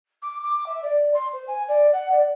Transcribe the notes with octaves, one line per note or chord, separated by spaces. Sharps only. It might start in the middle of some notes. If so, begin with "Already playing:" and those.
D6
D6
E5
D5
C6
C5
G#5
D5
F#5
D5